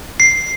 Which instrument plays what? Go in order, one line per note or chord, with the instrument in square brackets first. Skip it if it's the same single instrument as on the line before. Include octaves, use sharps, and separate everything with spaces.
[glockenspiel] C7